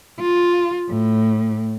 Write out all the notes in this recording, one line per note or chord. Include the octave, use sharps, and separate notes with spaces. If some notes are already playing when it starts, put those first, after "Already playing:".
F4
A2